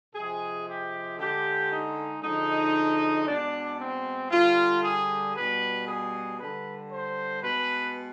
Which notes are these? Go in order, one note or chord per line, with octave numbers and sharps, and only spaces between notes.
C3 F3 G#3 G#4
G4
D3 G#3 G4
D#4
D3 F3 G#3 D#4
B2 G#3 D4
C4
D3 G3 F4
G#4
B2 G3 B4
G#4
D3 G3 B4
C5
B2 G#3 B4